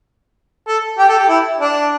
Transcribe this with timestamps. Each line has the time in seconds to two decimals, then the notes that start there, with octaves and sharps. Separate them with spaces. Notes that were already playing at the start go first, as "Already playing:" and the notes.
0.68 A4
0.99 G4
1.09 A4
1.19 G4
1.29 E4
1.60 D4